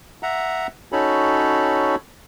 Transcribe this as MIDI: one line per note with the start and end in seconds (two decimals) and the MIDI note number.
0.23 0.67 76
0.23 0.67 78
0.23 0.67 82
0.92 1.95 61
0.92 1.95 63
0.92 1.95 66
0.92 1.95 69
0.92 1.95 73
0.92 1.95 83